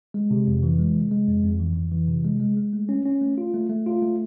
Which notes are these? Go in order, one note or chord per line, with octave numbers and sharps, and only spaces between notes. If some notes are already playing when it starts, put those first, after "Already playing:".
G#3
C3
F2
E3
G#3
C3
G#3
F2
F2
E3
F2
E3
C3
G#3
G#3
G#3
A3
C#4
C#4
A3
F4
A3
A3
F4
A3